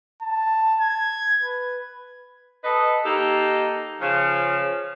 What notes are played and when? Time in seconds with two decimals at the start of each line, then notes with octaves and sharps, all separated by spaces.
0.22 A5
0.81 G#6
1.43 B4
2.64 A4 B4 D#5
3.05 A#3 D#4 G4 A4
4.01 C#3 F3